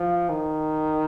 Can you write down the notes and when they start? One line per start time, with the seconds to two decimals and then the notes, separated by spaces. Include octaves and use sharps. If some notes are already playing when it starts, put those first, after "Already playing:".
Already playing: F3
0.29 D#3